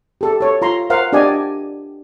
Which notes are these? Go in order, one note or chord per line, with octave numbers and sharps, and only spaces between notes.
G4 A4
A4 C#5
F4 A#5 C6
A#4 C5 F5 F#5
D4 G4 D5 D#5 G#5